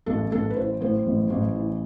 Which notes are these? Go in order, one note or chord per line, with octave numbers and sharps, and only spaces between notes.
A1 A4
A1 A4
B4
E3 C5
A2 C5
A1
A1
E3